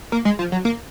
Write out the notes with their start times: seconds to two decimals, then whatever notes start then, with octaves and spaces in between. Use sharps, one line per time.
0.12 A#3
0.25 G#3
0.39 F3
0.52 F#3
0.65 A#3